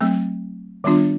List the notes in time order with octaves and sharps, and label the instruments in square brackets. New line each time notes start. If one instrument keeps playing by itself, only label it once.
[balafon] F#3 A3 C4
D#3 G3 B3 D4 F4